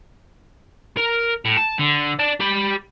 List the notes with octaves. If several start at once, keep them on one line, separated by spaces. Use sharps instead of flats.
A#4
A2
A5
D3
D5 A5
G4 B5